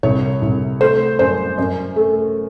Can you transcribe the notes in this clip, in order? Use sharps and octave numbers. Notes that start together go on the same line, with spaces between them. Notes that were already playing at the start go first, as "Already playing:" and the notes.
C2 C#5
C2
A3 C5
F#2 C5
F#2
A3